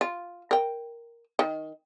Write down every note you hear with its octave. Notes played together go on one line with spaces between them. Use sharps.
F4
A#4 G5
D#3